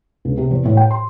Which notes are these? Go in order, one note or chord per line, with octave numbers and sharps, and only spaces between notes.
C#2
C3
E2
A2
G5
C6